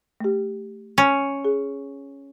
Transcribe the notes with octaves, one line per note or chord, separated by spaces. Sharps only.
A3 G4
C#4
G#4